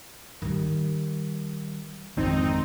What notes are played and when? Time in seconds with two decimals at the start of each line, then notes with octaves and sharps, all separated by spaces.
0.42 D#3 G3
2.17 G#1 F2 C4 D#4